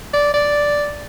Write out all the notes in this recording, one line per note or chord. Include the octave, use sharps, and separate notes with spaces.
D5
D5